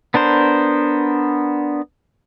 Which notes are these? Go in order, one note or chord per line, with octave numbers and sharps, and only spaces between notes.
B3 D4 A#4 C5